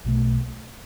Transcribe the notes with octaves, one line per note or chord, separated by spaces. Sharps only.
B1 B2 A3